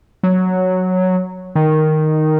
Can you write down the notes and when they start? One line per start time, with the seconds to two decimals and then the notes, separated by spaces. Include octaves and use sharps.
0.23 F#3
1.55 D#3